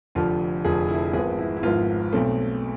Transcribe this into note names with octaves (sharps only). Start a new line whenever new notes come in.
F1 F2 D3 F3 F4
F1 F2 D3 F3 G#4
E4
G#1 G#2 F3 B3 G#4
E4
E4
G#1 G#2 F3 B3 F4
B1 B2 A3 C4